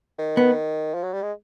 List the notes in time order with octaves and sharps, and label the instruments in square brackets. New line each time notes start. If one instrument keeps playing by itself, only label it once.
[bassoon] D#3
[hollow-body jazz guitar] B3
[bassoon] F3
F#3
G3
G#3